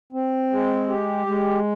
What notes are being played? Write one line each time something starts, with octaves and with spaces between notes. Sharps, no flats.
C4
G#3
G4
G#3